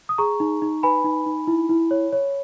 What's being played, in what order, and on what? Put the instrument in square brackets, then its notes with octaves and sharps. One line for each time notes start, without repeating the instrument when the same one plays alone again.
[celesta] D#6
G#4 A#5 C#6
D#4
D#4
B4 G#5 B5
D#4
D#4
E4
E4
C#5
C#5